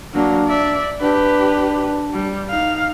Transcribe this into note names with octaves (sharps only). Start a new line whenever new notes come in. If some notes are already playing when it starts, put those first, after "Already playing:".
F#3 A#3 D4
D5 E5
D4 G4 B4
G3
D#4 F5